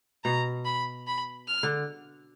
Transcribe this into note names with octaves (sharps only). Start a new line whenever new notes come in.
B2 A#5
B5
B5
F6
D3